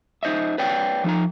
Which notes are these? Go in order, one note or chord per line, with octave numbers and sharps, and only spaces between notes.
D#4 C5 D#5 E5
B4 C#5 D5 G5
F3 D#4 A#5